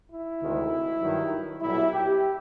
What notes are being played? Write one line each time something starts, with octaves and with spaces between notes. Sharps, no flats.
E4
D2 C3 D#3 G#3
G2 D#3 F#3
B1 A#2 G3 E4
G4